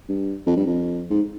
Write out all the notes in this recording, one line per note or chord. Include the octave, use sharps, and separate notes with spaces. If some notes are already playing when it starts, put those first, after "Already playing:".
G2
F2
G2
F2
G#2